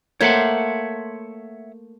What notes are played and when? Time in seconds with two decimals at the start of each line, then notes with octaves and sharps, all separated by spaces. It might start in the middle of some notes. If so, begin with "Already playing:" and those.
0.21 A3 A#3 C5 C#5 E5 F#5